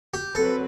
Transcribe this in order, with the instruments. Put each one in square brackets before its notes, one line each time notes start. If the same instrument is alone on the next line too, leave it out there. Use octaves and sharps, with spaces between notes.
[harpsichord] G4
[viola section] F#3 C4 F#4 B4 [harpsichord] A4